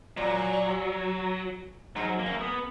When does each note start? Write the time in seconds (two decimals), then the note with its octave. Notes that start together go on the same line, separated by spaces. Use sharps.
0.17 A#2 F#3
1.96 G#2 F#3
2.19 A#3
2.26 F#2
2.41 B3